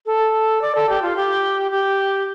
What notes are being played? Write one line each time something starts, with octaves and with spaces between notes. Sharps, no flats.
A4
D5
A4
G4
F4
G4
G4